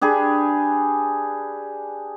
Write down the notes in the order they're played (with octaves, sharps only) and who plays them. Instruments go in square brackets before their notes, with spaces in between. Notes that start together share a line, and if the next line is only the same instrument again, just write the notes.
[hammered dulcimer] D4 G4 G#4 B4